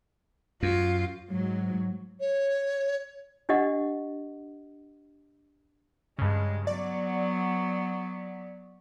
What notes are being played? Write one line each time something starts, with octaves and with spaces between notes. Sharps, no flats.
F#2 F4
G#2 F#3
C#5
D4 G4 D#5 F#5
G2 C#3 G#3
F#3 B3 D5